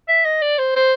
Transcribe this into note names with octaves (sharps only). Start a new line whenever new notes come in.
E5
D#5
D5
C5
C5